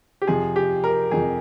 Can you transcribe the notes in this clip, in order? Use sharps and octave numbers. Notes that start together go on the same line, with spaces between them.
G4
F2 C3 F3 G#4
G4
A#4
F2 C3 F3 G#4